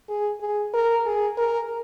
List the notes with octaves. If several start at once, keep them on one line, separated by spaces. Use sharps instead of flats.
G#4
G#4
A#4
G#4
A#4